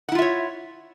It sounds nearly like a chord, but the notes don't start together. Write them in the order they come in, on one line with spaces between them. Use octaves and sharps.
F#5 E4 F4 E5 C#5